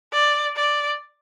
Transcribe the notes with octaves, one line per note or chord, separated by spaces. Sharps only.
D5
D5